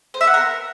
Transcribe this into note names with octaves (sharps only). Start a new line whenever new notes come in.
C5
E5
F#5
A#4